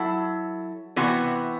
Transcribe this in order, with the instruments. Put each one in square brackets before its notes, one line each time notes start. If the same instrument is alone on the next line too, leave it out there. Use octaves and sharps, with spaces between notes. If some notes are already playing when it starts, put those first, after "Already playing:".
Already playing: [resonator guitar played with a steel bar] F#3 E4 A4
C3 E3 B3 F#4